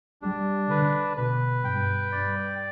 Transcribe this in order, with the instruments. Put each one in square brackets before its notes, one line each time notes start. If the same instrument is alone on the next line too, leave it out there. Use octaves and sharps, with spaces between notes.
[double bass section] G3 [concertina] D4
[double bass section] D3 [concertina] B4
[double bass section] B2 [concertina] B4
[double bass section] G2 [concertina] G5
[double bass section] G2 [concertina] D5